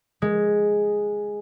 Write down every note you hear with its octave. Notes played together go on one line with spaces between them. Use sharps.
G#3